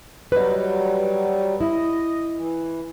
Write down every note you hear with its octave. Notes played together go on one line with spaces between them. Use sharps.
F#3 G3 B4 D#5
E4 D#5
E3